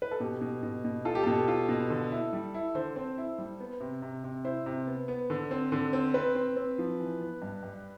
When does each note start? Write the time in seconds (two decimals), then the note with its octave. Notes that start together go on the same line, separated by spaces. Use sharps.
0.02 B4
0.11 A4
0.20 B2 G4
0.41 B2
0.63 B2
0.85 B2
1.05 F4 A4
1.15 G4
1.23 B2 A4
1.48 F4
1.69 B2
1.90 D3
2.12 E4
2.33 G3
2.54 E4
2.75 D3 C5
2.96 C4
3.18 E4
3.38 G3
3.60 B3
3.80 C3
4.02 C3
4.24 C3
4.45 E4 C5
4.66 C3
4.87 B3
5.08 B3
5.30 D3
5.51 C4
5.72 D3
5.93 C4
6.14 C4 B4
6.35 C4
6.56 C4
6.78 F3
7.00 E3
7.20 B3
7.42 G2
7.63 G2